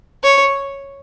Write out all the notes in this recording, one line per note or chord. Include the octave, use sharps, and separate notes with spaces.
C#5